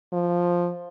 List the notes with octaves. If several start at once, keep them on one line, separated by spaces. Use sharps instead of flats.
F3